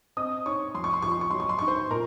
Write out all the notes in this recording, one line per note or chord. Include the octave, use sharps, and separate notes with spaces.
C4 D#5 D#6
D#4 C#5 C#6
F2 C6
C#6
C6
F3 C#6
C6
C#6
F#3 C6
C#6
C6
D#4 C#6
C5 C6
A#2 A#4 A#5